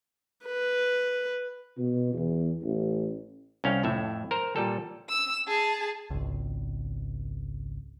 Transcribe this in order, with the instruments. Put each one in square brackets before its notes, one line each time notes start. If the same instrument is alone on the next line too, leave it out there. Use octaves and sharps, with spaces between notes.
[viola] B4
[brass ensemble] B2
E2
A1
[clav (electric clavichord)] C2 C#4 F5 G5
F2 A2 E5
A#4 C5 A#5
A#2 G3 A4
[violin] E6
G#4 A5
[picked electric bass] G#1 C#2